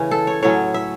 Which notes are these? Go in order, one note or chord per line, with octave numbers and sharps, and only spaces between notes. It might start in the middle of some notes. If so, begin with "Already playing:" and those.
Already playing: C#3 E3 A3 C#4
A4
C#5
A2 F#3 C#4 C#5
E5